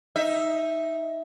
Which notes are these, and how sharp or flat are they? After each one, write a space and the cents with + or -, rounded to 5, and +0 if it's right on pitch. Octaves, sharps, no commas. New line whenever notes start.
D#4 +10 E5 +0